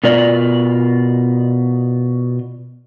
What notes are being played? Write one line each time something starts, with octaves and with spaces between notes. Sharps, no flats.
B2 F4 A#4 D5